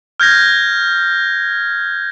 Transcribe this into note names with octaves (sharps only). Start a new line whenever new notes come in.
F6 G6 G#6 A#6